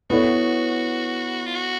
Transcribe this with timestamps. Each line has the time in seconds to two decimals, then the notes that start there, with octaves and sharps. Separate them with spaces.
0.10 B3 E4 F#4 A4 C#5
1.46 F4
1.55 F#4